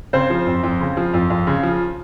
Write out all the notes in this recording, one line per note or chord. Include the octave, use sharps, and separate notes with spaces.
C#3 C4 C5
F3
F2
F2
C#3
F3
F2
F2
C#3
F3